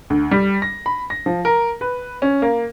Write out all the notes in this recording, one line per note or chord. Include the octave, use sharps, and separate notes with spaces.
D2
G3
A#6
B5
A#6
F3
A#4
B4
C#4
A#3